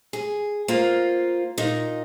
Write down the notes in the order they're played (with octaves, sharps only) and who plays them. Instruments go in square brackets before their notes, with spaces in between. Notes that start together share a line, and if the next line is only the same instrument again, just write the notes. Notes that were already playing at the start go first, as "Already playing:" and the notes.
[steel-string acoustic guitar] G#4
A#3 F4 C5
A#2 D#4